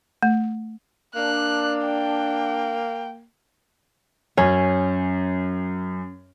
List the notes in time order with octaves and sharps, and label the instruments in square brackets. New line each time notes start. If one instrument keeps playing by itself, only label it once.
[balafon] A3
[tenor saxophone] A#3 [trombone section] D4 [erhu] F#6
[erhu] G5
[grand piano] F#2 [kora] C#4